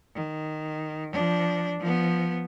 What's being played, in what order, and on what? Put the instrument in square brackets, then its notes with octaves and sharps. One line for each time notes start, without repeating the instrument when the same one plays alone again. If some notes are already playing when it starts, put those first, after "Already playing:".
[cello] D#3
F3 D4
F3 B3